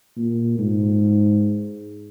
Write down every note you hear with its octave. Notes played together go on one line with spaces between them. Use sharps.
A#2
G#2